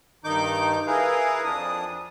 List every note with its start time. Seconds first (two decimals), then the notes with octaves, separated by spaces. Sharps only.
0.24 G2 D#3 D#4 D6 G6
0.87 E4 G#4 A#4 B4 F5
1.44 F2 D4 D#6